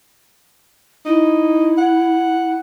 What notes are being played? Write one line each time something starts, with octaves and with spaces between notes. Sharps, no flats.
D#4 E4
F#5